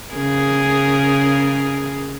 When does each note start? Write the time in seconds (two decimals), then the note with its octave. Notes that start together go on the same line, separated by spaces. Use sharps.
0.15 C#3 G#4 A#4